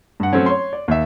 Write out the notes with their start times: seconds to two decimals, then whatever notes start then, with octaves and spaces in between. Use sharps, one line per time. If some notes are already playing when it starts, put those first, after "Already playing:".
0.20 G2 F#5
0.33 F#3 A3 C4 C#4
0.46 C#5 C6
0.73 D5
0.88 D#2 E5